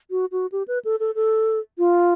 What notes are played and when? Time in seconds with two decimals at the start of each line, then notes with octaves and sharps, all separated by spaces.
0.11 F#4
0.32 F#4
0.52 G4
0.68 B4
0.85 A4
1.00 A4
1.15 A4
1.78 F4